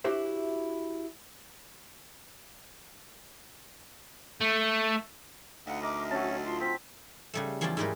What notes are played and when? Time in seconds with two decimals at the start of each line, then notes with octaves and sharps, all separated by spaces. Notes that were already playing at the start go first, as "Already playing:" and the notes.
0.04 D4 E4 F#4 G4 C5 E5
4.41 A3
5.67 D2 D#4 F5 F#5
5.83 A#4 D#5 E5 D6
6.11 F#3 C#4 A5
6.46 F4 C6
6.60 C4 B6
7.34 C#3 G3 A3
7.61 E2 F3 C#4 D5 G5 A5
7.77 G#2 E3 G3 D#4 A#4 B4